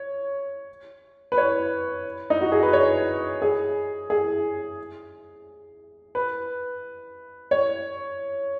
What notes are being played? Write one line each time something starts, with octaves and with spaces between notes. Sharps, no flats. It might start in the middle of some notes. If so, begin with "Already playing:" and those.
Already playing: C#5
B4
C#5
D#4
F#4
G#4
B4
C#5
G#4
G#4
B4
C#5